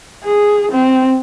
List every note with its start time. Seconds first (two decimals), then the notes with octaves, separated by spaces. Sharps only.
0.24 G#4
0.71 C4